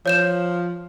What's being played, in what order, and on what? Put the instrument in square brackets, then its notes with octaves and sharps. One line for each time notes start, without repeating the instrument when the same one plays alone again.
[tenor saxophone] F3 [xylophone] C#5 G6 E7